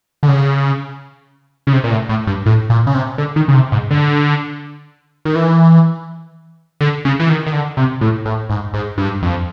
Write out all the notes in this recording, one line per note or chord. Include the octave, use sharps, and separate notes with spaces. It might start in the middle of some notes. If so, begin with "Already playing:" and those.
D3
C#3
C#3
C3
A#2
A2
A2
G2
A2
A#2
C#3
C3
D3
D#3
C#3
C3
G#2
D3
D#3
E3
D3
C#3
E3
D#3
D#3
D3
C3
A2
A2
G#2
G#2
G2
F2